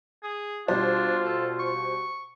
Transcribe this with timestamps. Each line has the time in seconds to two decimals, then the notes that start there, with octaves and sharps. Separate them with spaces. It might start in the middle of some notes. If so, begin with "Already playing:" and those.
0.23 G#4
0.68 B2 G3 D4 F4 C5
1.25 A4
1.59 C#6